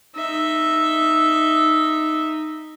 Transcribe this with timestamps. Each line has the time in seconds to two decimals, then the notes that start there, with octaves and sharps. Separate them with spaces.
0.15 D#4 E5